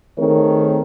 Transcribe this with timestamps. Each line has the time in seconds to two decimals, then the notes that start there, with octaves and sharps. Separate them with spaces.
0.17 D#3 A3 C4 G#4 A#4 C#5